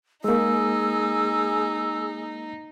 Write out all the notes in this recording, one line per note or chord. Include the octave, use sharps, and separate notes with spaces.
G#3 A#3 D#4 G#4 E6